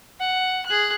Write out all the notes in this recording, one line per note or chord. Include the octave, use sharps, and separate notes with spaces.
F#5
G#4 F#6